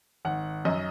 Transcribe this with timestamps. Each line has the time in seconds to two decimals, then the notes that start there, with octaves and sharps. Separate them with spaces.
0.25 G#1 F#5
0.65 F#2 D#5